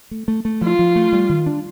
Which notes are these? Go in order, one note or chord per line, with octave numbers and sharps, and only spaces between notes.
A3
A3
A3
F3 F4
F3
A3
G3
D#3
D4